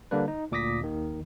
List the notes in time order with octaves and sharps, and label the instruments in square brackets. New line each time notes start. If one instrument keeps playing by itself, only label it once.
[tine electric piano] D3 G3 A#3 D4 B4
D#4
D2 A#2 D6 D#6 A#6 B6
D#2 D#3